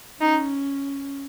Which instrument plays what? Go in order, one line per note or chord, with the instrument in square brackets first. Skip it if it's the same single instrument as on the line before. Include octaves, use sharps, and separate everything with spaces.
[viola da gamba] C#4 [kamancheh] D#4